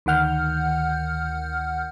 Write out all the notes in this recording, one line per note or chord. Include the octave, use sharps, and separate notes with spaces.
D2 D#3 F#5 F6 G6